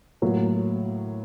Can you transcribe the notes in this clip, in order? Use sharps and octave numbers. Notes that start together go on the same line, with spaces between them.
A2 F#3 A#3